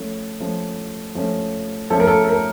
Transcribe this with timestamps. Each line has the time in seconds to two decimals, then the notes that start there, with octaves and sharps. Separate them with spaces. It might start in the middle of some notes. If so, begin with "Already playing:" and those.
Already playing: F3 A3 C#4
0.40 F3 A3 C#4
1.15 F3 A3 C#4
1.90 F3 A3 C#4 A4
2.00 A#4
2.07 A4
2.25 A4
2.29 A#4